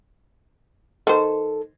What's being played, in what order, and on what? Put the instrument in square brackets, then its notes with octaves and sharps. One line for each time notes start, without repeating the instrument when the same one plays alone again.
[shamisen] D#3 C5 [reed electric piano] A4